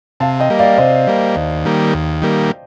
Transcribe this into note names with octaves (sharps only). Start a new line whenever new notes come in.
C3 F5 A5
D#5 G5
G3 A#3
D5 F5
C3 C5 D#5
G3 A#3
D#2
D#3 G3 A#3
D#2
D#3 G3 A#3